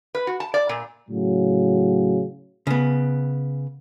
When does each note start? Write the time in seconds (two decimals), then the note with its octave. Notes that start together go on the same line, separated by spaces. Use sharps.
0.15 B4
0.27 F#4
0.40 A5
0.54 D5
0.69 A#2
1.10 A2 C#3 F#3
2.67 C#3 B3